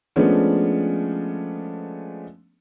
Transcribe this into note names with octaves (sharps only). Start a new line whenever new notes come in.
F3 G#3 A3 B3 C#4 D4